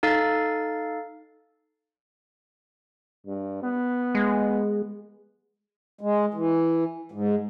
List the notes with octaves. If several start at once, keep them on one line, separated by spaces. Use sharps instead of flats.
D#4 A4 F5 A6
G2
B3
G#3
G#3
E3
G#2